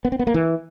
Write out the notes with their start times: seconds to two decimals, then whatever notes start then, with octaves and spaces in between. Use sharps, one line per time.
0.05 B3
0.12 C4
0.19 B3
0.27 A#3
0.34 E3